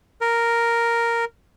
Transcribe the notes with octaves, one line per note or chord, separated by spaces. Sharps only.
A#4